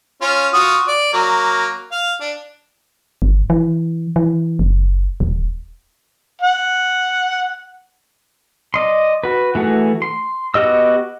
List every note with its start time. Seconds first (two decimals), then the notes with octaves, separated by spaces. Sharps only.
0.22 C#4 F4
0.53 F4 F#4 D#6
0.88 D5
1.13 F#3 A#3
1.92 F5
2.21 D4
3.22 G1
3.50 E3
4.16 E3
4.59 F#1
5.20 D#1
6.42 F#5
8.74 D5 D#5 C6
9.24 F#4 B4
9.55 E3 A3 F#4 G#4
10.02 C6
10.54 B3 F#4 G4 D#5 E6